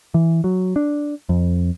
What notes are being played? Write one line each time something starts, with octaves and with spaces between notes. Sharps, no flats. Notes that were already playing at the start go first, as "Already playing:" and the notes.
E3
F#3
D4
F2